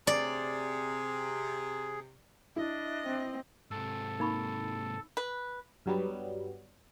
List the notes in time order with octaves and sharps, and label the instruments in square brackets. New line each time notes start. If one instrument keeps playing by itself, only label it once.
[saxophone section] C3 [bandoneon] G#4 [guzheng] D5
[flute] D4 [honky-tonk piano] E4 [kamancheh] D#5
[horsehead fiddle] C4
[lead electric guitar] G#2 C3 [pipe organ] A4
[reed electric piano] A#3 [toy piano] D#4 B5 C#6
[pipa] B4
[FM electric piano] G2 F#3 G3 B3